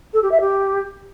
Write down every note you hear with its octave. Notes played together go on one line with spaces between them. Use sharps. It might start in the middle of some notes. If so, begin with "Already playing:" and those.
A4
G4
E5
G4